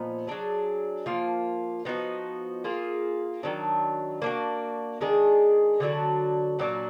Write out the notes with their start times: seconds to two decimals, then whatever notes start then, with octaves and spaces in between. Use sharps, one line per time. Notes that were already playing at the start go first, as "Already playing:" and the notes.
Already playing: A#2 F3 B3 D#4
0.27 F#3 D4 G#4
1.06 F3 A#3 F4
1.85 F3 B3 D#4 F#4
2.64 A#3 F4 G#4
3.43 D#3 F#3 D4
4.22 A#3 D4 F#4
5.01 D#3 G#3 D4 G#4
5.80 D3 F#3 D4 F#4
6.59 A#2 F#3 D4 F#4